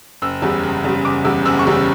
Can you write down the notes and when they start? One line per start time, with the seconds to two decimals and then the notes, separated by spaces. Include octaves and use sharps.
0.22 F#1 E6
0.42 E2 C#3 G3
0.63 F#1
0.84 E2 C#3 G3
1.05 F#1 D6
1.25 E2 C#3 G3 E6
1.45 F#1 E6
1.59 C#6
1.66 E2 C#3 G3